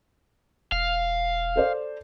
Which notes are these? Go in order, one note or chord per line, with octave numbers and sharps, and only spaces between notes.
E1 F5
A4 C5 D5